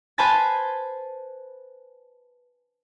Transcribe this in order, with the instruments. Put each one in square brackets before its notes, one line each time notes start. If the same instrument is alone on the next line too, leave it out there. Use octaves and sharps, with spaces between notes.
[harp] B4 C5 G#5 A5 B5 A6